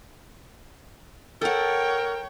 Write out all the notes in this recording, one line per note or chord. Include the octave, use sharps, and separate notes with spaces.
A4 A#4 C#5 F#5 G5